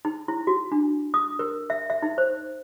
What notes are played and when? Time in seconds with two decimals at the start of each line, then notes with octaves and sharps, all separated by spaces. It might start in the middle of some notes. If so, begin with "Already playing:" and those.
0.05 D#4
0.28 E4
0.47 F#4
0.72 D4
1.14 D#6
1.39 A#4
1.70 E5
1.90 E5
2.02 D#4
2.18 C5